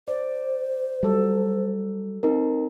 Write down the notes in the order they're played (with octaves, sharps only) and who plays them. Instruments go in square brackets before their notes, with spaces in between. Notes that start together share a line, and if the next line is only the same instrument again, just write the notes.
[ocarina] C5 [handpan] D5
[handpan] F#3 A4 [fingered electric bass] G3
[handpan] C4 [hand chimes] D#4 A#4